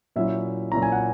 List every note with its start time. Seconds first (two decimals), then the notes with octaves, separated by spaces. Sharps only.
0.16 A#2 F#3 C#4 E4 E5
0.72 A#2 F#3 C#4 E4 A#5
0.82 G#5
0.92 F#5